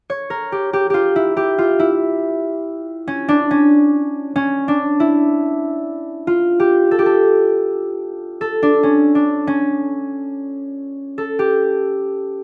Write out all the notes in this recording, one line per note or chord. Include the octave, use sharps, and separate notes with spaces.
C#5
A#4
G4
G4
F4 G4
E4
G4
F4
E4
C#4
D4
C#4
C#4
D4
E4
F4
G4
A4
G4
A4
A4
D4
C#4
D4
C#4
A4
G4